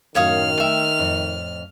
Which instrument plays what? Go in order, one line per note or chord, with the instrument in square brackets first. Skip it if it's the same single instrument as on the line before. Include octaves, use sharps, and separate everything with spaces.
[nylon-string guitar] F#2 A2 F#4 [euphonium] D#3 [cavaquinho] C#5 F5 D#6 [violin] F6
[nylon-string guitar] A3 G5 [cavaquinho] E5
[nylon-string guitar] F2 A2